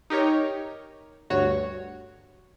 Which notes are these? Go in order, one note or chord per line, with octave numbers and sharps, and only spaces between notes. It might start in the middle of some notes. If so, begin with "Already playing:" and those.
D#4 G4 A#4 C#5
D2 G2 F#4 C#5